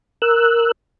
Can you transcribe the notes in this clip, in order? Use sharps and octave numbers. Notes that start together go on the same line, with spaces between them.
A#4 E6 F#6